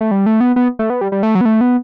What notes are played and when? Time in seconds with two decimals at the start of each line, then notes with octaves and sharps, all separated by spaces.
0.01 A3
0.11 G3
0.26 A3
0.41 B3
0.56 B3
0.79 A3
0.90 B3
1.01 G3
1.12 G3
1.23 A3
1.35 F#3
1.41 B3
1.45 A3
1.61 B3